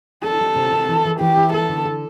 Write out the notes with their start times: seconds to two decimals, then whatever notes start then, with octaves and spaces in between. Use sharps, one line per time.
0.24 D4 A4
0.41 G3
0.56 C3
0.72 C3
0.88 E3
1.05 E3
1.20 E3 G4
1.37 E4
1.53 B3 A4
1.69 D3
1.85 A4